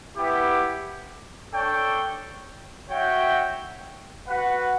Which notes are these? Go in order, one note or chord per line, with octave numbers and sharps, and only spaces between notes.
B3 E4 G4
D4 A4 C#5 G5
F#4 C#5 E5 G5
F#4 B4 F#5